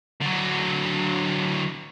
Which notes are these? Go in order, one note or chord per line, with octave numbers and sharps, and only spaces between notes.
D3 F#3